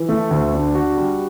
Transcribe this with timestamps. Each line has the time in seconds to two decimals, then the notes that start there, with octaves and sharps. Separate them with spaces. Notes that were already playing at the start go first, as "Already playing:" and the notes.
Already playing: E3
0.09 A3
0.31 D2
0.54 D4
0.75 F#4
0.97 G3